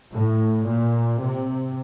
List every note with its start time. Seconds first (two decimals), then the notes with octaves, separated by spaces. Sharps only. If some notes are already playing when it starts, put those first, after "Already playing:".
0.13 A2
0.67 A#2
1.20 C3